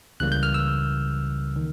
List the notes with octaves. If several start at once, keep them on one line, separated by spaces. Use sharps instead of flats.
C#2 C#3 E3 G3 A#3 F#6
G6
F6
E6
D#3